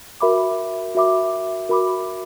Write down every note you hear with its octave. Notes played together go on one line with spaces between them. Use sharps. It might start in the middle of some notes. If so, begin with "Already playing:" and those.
F#4 A#4 E5 B5 D6
F#4 A#4 E5 B5 D6
F#4 A#4 E5 B5 D6